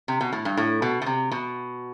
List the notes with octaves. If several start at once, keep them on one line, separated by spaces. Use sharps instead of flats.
C3
B2
A2
G2
A2
B2
B2
C3
B2